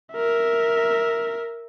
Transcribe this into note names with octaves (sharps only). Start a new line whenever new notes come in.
A#4 E5